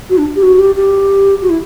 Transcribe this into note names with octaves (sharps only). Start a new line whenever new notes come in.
F#4
D4
G4
F#4
G4
G4
F#4
E4